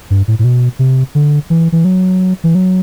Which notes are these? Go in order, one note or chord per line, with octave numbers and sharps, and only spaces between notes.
G2
A2
A2
B2
C3
D3
E3
E3
F#3
E3
F#3